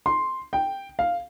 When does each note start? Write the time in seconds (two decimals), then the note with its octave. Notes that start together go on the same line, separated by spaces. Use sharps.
0.06 C6
0.53 G5
0.99 F5